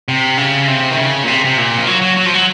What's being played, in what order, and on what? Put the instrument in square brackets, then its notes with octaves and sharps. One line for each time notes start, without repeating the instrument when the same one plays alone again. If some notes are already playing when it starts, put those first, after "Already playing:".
[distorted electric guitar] C3
C#3
C3
D#3
C#3
A#2
C3
C3
A#2
F3
F#3
F#3
F#3
F3
F#3